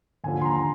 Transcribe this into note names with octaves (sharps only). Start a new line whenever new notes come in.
D#2 D3 F3 G#5
C6
A#5
A#5